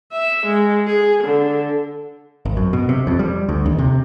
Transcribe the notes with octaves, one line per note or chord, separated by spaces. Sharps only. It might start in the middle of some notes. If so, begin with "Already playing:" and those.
E5
G#3
G#4
D3
G#1
F#2
B2
C3
F2
G3
D2
D#2
C3